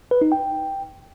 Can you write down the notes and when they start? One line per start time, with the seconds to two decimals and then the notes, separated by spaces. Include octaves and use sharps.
0.11 B4
0.21 D#4
0.32 G5